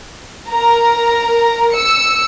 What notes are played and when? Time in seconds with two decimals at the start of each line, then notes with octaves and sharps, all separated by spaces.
0.49 A#4 A#5
1.72 E6 C#7